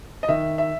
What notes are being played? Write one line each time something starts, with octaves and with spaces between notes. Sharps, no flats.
D#5
D#3 E5
E5